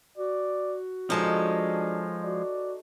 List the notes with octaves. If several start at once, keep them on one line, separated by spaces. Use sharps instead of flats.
F#4 D5
F3 G#3 D4 D#4 A4 C#5
F#4 D5